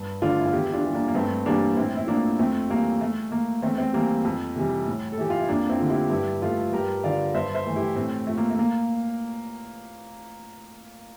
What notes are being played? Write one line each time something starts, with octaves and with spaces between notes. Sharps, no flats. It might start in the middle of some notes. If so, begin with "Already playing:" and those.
Already playing: G2
D3 F3 A3 D4 F4
E4
F4
E2 E4 G4
D4 F4
E3 G3
A#3 D4
A#3
G2 A3 C4
E3 G3 A#3 D4
A2 C4 E4
E4
F3 A3 A#3 D4
F2 A3 C4
E3 G3 A#3
A#2 A3
A3 A#3
E2 A3 C4
A3 C4
E3 G3 A#3
F2
C3 E3 G3
A2
A4
E3 A3 G4
F4
E4
F2 A#3 D4
C4 E4
D3 F3 A3
E4 G4
G2 E4 G4
F3 A3 F4 A4
G2 G4 A#4
D3 F3 D5 F5
G2 C5 E5
C5 E5
E3 A3
E4 G4
A2 A3 C4
F3 A3
A#3
A3
A#2 A#3